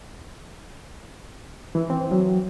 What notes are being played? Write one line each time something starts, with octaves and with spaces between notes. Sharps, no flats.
E3
C4
F#3